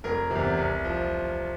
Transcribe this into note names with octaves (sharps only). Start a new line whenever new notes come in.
F1 A#4
E2 C3
C2
F3